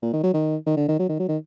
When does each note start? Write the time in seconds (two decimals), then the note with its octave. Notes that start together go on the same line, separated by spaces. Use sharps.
0.02 A#2
0.13 D#3
0.23 F#3
0.34 D#3
0.66 D#3
0.76 D3
0.88 D#3
0.99 F#3
1.09 D#3
1.19 F#3
1.28 D#3